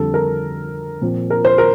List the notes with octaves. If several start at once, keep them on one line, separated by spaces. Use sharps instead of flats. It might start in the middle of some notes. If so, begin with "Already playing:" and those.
Already playing: F2 D3 G3 A4
A#4
A#2 F3 C4
A#4
C5
A#4